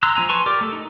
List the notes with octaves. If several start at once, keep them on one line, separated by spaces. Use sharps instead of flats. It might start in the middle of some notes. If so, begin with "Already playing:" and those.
A#5 C6 E6 F#6
F3 C4 G#5 A#5
B4 G#5 A5 C6 C#6
G4 A#4 D5 D6
A3 A4
D#4